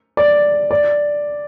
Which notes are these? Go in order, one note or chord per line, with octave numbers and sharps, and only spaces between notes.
D5
D5